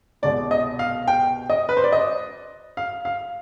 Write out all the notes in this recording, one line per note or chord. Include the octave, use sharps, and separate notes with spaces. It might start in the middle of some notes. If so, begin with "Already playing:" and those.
C2 B2 G#3 D5
D#5
F5
G5
D#5
B4
C5
D5
D#5
F5
F5